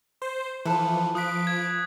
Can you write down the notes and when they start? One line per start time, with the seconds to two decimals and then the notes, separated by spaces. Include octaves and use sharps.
0.22 C5
0.65 E3 F3 A4 B4
1.15 F3 D#6 F#6 B6 D7
1.47 G#6